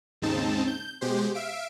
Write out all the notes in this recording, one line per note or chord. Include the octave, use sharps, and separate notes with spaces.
D#2 G#2 C#3 C4 D#4 A5
G6
B2 G#3 G4 C5
E5 F5 D7